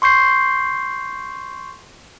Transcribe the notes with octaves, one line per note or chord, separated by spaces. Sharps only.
C6 C#6 G6 C7